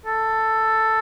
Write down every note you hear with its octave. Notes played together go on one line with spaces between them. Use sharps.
A4